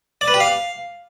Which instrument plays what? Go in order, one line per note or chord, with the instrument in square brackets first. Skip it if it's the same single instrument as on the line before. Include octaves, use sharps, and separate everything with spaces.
[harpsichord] D5
B4
G4
F5